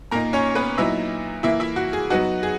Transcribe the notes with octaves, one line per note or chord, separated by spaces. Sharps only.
A#2 A#3 D#4 A#4 A#5
C#4 C#5
B3 B4
A#2 F#3 B3 D#4 E4 E5
E3 A#3 E4 E5
E4 E5
F#4
G#4
F#3 B3 D#4 F#4
G#4